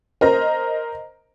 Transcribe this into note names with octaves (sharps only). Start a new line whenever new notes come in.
A#4 C5 D#5 A#5